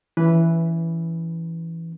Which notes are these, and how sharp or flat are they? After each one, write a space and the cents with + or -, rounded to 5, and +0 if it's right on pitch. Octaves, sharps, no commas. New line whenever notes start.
E3 +5 C#4 +15 B4 -5